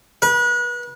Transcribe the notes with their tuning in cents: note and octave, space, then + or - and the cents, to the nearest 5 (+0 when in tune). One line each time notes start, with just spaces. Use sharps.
B4 -35